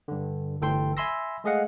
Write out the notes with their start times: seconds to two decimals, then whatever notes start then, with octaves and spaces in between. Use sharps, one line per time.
0.08 G2 D3
0.61 G1 D2 E3 A4 G5 C6
0.97 E5 G#5 B5 C6 E6 A#6
1.44 G#3 A3 G#4 D#5 F5 F#5